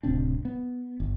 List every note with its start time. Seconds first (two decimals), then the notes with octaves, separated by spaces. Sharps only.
0.03 D1 C3 C4 D4
0.45 B3
1.00 G1